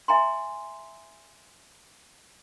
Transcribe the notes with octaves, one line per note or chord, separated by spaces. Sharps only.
E5 G#5 A#5 C6